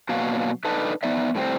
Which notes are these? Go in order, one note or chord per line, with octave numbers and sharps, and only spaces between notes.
B2 F#3 A#3 D4 F#4 F5
D4 D#4 A4 B4
B3 D#4 D5 E5
A2 G3 C4